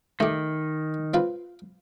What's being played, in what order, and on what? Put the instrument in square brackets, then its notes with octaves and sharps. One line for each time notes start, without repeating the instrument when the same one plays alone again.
[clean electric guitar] D#3 [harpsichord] A3 G4
[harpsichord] C4 F4 B4